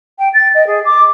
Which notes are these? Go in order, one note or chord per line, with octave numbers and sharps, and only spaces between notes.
G5
A6
D#5
G#4
D6